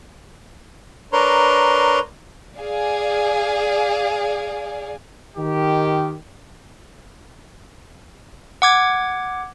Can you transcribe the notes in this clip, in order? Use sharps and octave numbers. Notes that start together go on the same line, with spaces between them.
D4 A#4 B4 C#5 A#5 C6
G#4 D5 F5
D#3 G4
F#5 D6 G#6